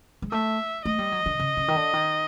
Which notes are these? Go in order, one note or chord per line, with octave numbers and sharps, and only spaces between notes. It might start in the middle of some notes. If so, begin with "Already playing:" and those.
G#3
A3 E5
A3 D#5
G3
F#3
D3
C#3
C#3
D#3
D3
D#3